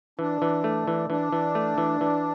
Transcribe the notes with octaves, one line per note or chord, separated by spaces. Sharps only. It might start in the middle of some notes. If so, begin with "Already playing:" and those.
E3 D4
E3
A3
E3
E3 D4
E3
A3
E3
E3